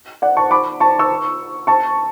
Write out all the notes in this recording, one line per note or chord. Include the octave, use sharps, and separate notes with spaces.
D5 F#5
A5 C#6
B5 D6
A5 C#6
C#6 E6
A5 C#6